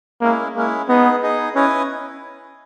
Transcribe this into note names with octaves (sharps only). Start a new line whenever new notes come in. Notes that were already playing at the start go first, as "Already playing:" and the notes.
G#3 A#3 C#4 E4
G#3 A#3 C#4 E4
B3 D#4 G#4 D#5
D#4 G#4 D#5
C#4 E4 B4 D#5 G#5